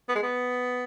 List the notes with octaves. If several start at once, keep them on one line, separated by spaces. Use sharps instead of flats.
B3
G#3
B3